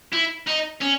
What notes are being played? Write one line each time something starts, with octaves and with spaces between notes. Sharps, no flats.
E4
D#4
C#4